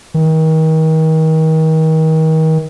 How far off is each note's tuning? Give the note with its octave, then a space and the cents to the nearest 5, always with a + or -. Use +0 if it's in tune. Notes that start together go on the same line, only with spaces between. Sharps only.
D#3 +35